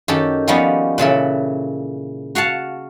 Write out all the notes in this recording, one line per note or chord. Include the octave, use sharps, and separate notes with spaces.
F#2 D#3 G4 A4
F3 G3 A#3 B3 C#4 D#4
A#2 C#3 E3 A4
F#4 F5 F#5 A5